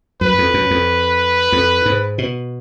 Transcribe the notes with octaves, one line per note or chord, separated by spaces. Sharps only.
F#2 B4
F2
F#2
F2
F2
G#2
B2